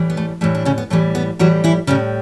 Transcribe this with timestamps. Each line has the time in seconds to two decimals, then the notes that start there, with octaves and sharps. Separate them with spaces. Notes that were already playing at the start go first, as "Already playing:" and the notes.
Already playing: A2 E3 G3
0.10 B3
0.17 A3
0.41 A2 E3 G3 A3
0.55 D4
0.65 C#3 C#4
0.78 B3
0.90 A2 E3 G3 A3
1.15 B3
1.39 A2 E3 F#3 G3 F#4
1.64 E3 E4
1.87 A2 C#3 G3 C#4